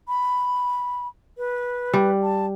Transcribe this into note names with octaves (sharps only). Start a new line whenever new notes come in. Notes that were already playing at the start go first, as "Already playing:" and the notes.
B5
B4
G3
A5